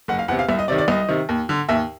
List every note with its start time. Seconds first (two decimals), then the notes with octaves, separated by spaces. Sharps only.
0.08 F#1 F#5
0.19 F5
0.28 E2 F#5
0.31 C3
0.39 F5
0.48 C2 E5
0.59 D#5
0.68 C3 D#3 D5
0.78 D5
0.88 C2 D#5
1.08 C3 D#3
1.29 D#2
1.49 D3
1.69 D#2 E5